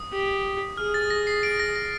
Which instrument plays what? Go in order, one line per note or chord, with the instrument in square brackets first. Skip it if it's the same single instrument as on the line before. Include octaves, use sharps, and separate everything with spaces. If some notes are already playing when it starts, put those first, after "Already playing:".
Already playing: [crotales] D#6
[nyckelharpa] G4
[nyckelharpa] G#4 [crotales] F6
[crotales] A6
A#6
C7
D7
A#6
A#6